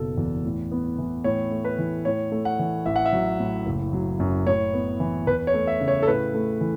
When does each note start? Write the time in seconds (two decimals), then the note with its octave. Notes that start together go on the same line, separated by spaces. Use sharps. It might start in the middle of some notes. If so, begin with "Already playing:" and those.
Already playing: F#1 B2 A4
0.18 E2
0.44 A2
0.72 B3
0.98 E3
1.24 A2 C#5
1.51 A3
1.65 B4
1.78 E3
2.05 A2 C#5
2.32 A3
2.45 F#5
2.59 E3
2.85 A1 E5
2.96 F#5
3.05 E5
3.13 F#3
3.40 A2
3.66 F#1
3.93 F#3
4.20 F#2
4.46 A2 C#5
4.73 B3
5.00 E3
5.27 E2 B4
5.47 C#5
5.54 A3
5.67 E5
5.80 C#3
5.88 C#5
6.02 A4
6.07 A2 B4
6.34 A3
6.61 E3